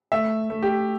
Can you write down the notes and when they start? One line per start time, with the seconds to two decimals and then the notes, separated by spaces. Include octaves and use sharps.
0.12 A3 E5
0.50 A3
0.63 G4